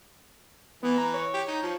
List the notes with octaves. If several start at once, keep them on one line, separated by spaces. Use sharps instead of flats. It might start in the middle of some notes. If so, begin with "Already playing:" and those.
E3 B3
A#5
C#5
G4
D#4
F3